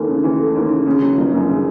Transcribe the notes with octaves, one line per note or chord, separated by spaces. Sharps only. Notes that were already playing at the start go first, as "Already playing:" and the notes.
Already playing: D#2 E3 A3
C#3
E3
A3
D#2
C#3
C#3
F#3
G1
F#2
C#3